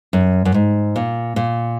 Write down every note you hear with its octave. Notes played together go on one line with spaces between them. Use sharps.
F#2
F#2
G#2
A#2
A#2